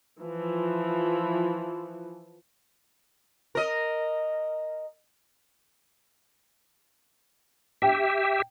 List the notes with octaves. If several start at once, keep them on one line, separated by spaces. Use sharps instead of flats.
E3 F3
A#4 D#5
G4 E5 G5